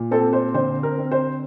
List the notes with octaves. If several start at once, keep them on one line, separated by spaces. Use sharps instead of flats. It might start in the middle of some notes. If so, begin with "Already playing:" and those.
Already playing: A#2
C4 A4 A5
C5
D3 C5
A#4
C4
C5